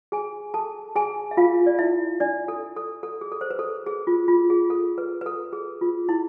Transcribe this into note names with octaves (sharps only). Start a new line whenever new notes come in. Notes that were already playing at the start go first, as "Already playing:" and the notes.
G#4 G#5
A4 A5
G#4 G#5
E5
F4 F5
D5
E4 E5
D4 D5
A4
A4
A4
G#4
A4
C5
B4
A4
G#4
F4
F4
G#4
A4
B4
B4
A4
G#4
F4
E4